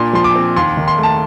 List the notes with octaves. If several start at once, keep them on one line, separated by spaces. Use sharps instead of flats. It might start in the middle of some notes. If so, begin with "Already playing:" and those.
Already playing: A#2 D4 C6
F3 C6
D6
C4
D#2 C6
D#3
C6
A3 A5